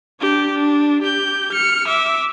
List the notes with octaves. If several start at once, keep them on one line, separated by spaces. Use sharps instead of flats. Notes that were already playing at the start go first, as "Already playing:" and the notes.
D4 G4
D4
G4 G6
F6 C#7
E5 D6